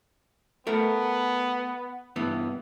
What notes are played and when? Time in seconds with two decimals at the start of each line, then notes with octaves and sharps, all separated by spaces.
0.67 A3 B3 A#4
2.16 G2 E3 B3